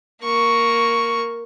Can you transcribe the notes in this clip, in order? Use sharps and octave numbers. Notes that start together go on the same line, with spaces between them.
A#3 C#6